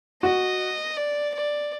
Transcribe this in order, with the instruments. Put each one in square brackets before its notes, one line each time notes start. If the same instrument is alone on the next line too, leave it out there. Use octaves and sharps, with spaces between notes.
[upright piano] F#4 [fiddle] D#5
[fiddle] D5
D5